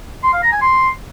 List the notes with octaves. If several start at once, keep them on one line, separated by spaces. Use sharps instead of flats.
C6
F5
A#5
G#5
C6